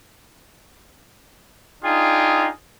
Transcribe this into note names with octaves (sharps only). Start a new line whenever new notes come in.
D4 D#4 F4 G#4 G5